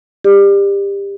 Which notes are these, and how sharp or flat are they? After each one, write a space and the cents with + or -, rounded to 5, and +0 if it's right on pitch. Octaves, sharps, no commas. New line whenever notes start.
G4 +25 D5 +25